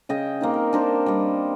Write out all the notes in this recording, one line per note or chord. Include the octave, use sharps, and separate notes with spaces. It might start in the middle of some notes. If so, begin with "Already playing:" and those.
C#3 D#5 G5
A#3 C4 D#4
A#4
D4 A#4 C5
G3 D#5